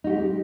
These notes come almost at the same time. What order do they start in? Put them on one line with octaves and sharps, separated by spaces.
D#4 F#4 G4 G#3